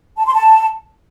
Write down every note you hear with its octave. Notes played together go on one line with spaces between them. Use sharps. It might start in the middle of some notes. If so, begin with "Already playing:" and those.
A5
C6
A5